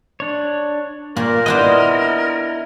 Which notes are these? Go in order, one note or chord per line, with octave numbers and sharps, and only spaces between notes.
D4 C#5
A#2 A#3 A#4
B3 D4 E4 C5 D#5